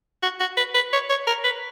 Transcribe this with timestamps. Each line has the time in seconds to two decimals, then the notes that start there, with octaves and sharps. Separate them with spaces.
0.23 F#4
0.40 F#4
0.57 B4
0.74 B4
0.93 C#5
1.10 C#5
1.27 A#4
1.44 B4